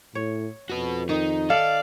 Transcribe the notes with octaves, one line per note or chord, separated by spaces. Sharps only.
A2 C#5
F2 F#4 B4
D#3 D#4
A4 D5 F5